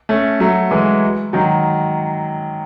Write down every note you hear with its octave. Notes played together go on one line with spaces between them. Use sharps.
A3 C#4
F#3 A3
E3 G#3
D#3 F#3